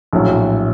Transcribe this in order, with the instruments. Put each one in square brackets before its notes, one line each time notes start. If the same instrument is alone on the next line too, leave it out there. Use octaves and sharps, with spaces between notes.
[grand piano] A#1 A2 F#3